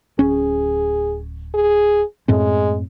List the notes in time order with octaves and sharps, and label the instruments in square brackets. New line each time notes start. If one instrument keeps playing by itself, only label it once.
[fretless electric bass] D1 C#4 [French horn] G#4
[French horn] G#4
[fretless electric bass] F#2 A2 C4 [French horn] G#3